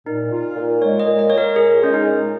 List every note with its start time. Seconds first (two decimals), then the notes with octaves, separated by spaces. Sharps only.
0.06 A#2 D#4
0.31 F4
0.56 A#2
0.82 G#3 C#5
1.00 D#5
1.06 A#2
1.19 D#5
1.30 F4 C#5
1.38 A#4
1.56 A#2 G#4
1.81 G#3 C#4
1.94 D#4
2.06 A#2